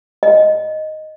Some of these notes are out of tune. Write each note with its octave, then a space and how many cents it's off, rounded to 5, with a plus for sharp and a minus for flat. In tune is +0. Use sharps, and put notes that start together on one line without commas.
D#5 +0